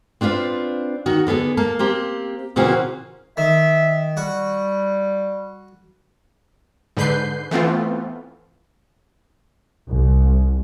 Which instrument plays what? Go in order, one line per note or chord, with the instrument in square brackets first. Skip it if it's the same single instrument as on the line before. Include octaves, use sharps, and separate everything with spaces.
[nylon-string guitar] C4 D4 F4 B4 F5
D#3 F#4
D3 B3 G#4 A4
A#3 A5
A#3 C4 G4
A#2 C#3 E3 C4 F#4
[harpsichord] D#3 [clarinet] E5
[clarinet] G3 [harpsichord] F#4
[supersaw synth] G#2 D3 B4 G6 C7
E3 A3 B3 C4 F4
[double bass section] C2